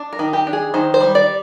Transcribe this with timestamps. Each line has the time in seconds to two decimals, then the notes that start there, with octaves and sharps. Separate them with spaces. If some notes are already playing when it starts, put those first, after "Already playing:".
Already playing: D4
0.13 A#4
0.19 D#3
0.33 G4
0.47 D4
0.53 G#4
0.74 D#3 C5
0.94 C5
1.01 G3
1.15 D5